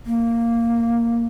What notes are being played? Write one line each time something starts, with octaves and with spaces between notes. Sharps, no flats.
A#3